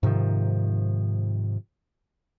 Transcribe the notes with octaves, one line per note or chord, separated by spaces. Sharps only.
G#2 C3 D#3 F3